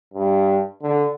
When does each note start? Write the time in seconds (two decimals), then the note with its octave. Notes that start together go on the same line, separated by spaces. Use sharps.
0.14 G2
0.82 D3